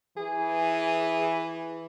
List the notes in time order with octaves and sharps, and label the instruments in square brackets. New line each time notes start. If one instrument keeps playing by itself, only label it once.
[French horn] E3 [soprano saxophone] G#4